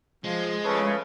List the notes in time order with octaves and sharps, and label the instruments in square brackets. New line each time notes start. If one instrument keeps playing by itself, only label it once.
[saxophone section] F3 [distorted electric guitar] G#3
[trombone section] E2 C#3 [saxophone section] F3 B4 C#5 [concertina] A3 A4